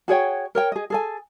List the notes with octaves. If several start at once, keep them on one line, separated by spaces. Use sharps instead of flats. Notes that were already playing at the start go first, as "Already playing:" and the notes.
F#4 G#4 C#5 G5
A#4 C#5 G5
G#4 D#5
G#4 A4 G#5